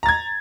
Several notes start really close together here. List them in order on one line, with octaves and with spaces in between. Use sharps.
A#5 A6 G#6